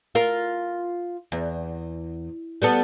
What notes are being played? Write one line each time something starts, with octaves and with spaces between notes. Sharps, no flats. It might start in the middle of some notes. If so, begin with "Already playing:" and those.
F4 A#4
E2
G3 B3 A4